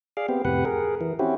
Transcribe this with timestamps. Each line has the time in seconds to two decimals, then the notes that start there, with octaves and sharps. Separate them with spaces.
0.17 G#4 D5 F5
0.29 B3 C4 G4
0.45 F2 A2 C3 G4 B4 F#5
0.65 G#4 A#4
1.01 E3
1.19 C4 C#4 E4 F#4 G4